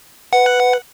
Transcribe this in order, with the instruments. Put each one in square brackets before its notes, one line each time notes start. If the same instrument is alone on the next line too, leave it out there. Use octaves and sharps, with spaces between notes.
[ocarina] B4 [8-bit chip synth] F#5